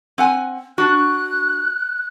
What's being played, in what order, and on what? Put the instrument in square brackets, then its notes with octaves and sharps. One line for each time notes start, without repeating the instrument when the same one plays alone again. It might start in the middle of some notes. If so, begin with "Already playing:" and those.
[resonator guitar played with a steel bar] C4 F#5 G#5
[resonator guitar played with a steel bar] D4 F#4 [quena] F#6